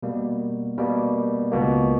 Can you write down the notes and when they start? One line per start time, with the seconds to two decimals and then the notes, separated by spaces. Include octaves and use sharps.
0.03 B2 G3 A#3
0.78 B2 G3 A#3
1.52 C#2 B2 A#3